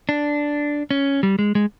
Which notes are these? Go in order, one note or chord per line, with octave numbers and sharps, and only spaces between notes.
D4
C#4
G3
G#3
G#3